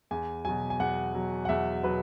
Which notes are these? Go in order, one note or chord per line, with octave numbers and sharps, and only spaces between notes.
E2 G#5
B2 F#3 G#5
G#5
E2 F#5
B2 F#3
F#5
E2 E5
B2 F#3 B4